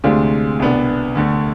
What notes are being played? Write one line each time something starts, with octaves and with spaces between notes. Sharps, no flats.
D2 C3 G#3 D4 F4
C2 B2 B3 D4
D2 D3 A3